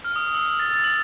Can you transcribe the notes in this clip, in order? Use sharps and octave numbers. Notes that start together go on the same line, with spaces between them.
F6
D#6
E6
A6
F#7